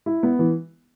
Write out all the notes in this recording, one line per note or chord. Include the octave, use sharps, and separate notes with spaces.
E4
B3
E3